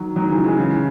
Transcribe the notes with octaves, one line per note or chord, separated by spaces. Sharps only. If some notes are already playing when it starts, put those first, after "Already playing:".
Already playing: D#3 F#3
D#3 F#3
C#3 E3
E3 G#3
C#3 E3